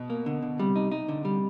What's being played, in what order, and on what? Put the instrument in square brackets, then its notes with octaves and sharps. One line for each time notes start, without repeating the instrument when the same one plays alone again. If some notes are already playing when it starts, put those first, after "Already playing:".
Already playing: [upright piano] B2
[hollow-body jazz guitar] A#3
D3
D3
[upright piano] C3 [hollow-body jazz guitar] G3
[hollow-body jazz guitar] D#4
D#4
D3
G3